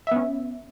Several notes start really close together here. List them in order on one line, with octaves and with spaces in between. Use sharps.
E5 B3 C#4